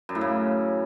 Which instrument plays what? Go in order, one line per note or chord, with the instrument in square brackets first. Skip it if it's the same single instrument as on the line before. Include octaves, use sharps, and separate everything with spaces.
[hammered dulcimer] F#2
A2
C#3